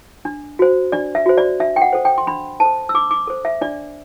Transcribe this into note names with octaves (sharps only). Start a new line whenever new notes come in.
D4
F#4 C5
D4 D5
E5
F#4 C5
D5
D4 E5
G5
F#5
A4 C5
G5
C6
D4 B5
A4 C5 A5
E6
D4 D6
D6
A4 C5
E5
D4 D5